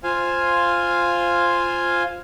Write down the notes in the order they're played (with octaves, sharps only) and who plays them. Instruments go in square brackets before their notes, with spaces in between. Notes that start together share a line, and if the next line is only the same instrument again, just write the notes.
[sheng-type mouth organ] F4 C5 F5 G#5